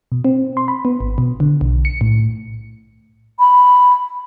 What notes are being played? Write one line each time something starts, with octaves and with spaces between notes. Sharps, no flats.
B2
C4
C6
B5
B3
G#1
B2
D3
B1
C#7
A2
B5